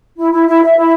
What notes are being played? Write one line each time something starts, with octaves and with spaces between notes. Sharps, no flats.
E4
E4
E4
E5
E4